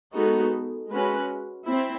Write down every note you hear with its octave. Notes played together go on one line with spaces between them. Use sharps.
G#3 B3 D#4 F#4 A4
G#3 C#4 F#4 B4
C4 E4